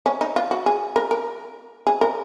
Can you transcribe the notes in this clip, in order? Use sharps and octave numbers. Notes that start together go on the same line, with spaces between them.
C#4
D#4
F4
F#4
G#4
A#4
A#4
G#4
A#4